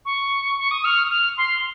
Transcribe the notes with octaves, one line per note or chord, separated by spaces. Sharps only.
C#6
C#6
D#6
F6
F6
C6